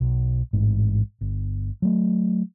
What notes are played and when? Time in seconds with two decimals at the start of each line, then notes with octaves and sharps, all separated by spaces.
0.01 B1
0.53 A1 G#2
1.21 G1
1.82 F#3 A3